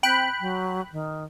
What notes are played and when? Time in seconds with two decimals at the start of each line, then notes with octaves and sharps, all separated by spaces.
0.03 C4 G5 B5 F#6
0.40 F#3
0.92 D#3